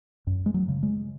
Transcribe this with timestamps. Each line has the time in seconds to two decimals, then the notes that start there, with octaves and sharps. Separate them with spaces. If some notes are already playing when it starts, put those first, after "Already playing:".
0.27 F#2
0.46 G#3
0.54 F#3
0.68 C#3
0.83 G#3